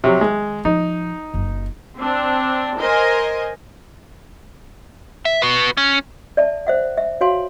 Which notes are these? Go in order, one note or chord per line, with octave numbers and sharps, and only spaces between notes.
C3 F3 F#3
D#3 G#3
F3 D#4
F#1 F#2
C4 D4
A#4 C5 D#5 G#5
E5
F#4 B4
C#4
D5 E5 A5
C5 E5 F#5
E5
F#4 C#5 F5 G#5 C6